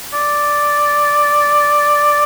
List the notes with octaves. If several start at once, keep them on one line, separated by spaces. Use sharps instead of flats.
D5